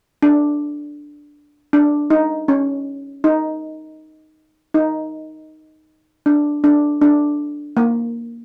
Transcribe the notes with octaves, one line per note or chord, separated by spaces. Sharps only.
D4
D4
D#4
C#4
D#4
D#4
D4
D4
D4
A#3